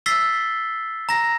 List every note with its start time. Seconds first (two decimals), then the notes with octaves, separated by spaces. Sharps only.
0.06 E6 A6 B6 C7 G7
1.09 A#5 A#6